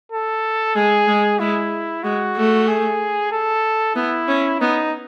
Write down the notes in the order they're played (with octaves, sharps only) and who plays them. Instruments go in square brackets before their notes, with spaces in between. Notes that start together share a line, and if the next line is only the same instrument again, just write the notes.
[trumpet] A4
[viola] G#3 [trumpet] G#4
[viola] G#3
[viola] G#3 [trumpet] E4
[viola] G#3 [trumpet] F#4
[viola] A3
[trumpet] G#4
A4
[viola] B3 [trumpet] E4
[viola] C#4
[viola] B3 [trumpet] D#4